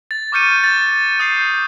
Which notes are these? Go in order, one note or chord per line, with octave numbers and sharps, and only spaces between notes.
A6
C#6 D6 F6 G6 C#7 D#7
A6
D#6 G6 C7